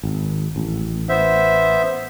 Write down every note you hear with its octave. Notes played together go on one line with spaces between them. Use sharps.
G#1
A1
B3 C5 E5